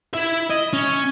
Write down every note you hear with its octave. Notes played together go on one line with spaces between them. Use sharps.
E4 E5
D#5
C#4